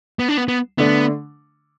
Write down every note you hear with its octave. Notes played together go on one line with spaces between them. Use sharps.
B3
D4
B3
B3
D3 A3 B3 D4